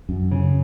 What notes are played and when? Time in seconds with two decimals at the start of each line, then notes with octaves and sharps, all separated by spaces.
0.09 F#2
0.32 C#3